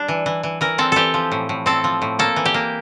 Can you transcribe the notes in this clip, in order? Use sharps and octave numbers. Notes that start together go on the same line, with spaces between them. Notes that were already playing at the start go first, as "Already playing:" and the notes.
Already playing: G3 D4
E3
E3
E3
E3 A#4
C4 A4
E3 G4 A4
F3
A2
A2
C4 A4
F3
A2
A#3 A4
E3
G4
A#3